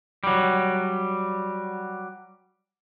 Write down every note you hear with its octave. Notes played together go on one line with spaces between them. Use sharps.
F#3 G3